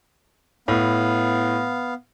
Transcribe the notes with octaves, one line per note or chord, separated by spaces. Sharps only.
A2 B3 F5